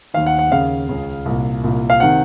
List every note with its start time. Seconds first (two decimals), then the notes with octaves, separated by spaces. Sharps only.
0.14 D#2 D#3 F5
0.26 F#5
0.39 F#5
0.51 D#2 C#3 F5
0.89 C#2 C#3
1.26 C2 A#2
1.64 C2 A#2
1.90 F5
2.00 C3 D#3 F#5